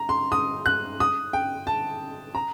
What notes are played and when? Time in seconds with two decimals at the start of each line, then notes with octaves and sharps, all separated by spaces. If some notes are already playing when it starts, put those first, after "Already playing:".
Already playing: A#5
0.09 C6
0.32 D#6
0.66 F#6
1.00 D#6
1.33 G5
1.67 A5
2.35 A#5